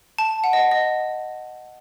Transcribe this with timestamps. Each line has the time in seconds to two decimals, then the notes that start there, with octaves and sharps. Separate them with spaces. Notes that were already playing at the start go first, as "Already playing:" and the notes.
0.18 A5
0.44 F#5
0.53 D#5
0.71 D#5